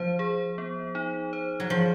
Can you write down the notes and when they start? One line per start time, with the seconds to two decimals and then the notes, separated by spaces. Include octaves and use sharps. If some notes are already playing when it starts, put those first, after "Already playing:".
Already playing: F3 C5
0.19 G#4
0.58 B3
0.95 D#4
1.33 C5
1.60 F#3
1.70 F3 G#4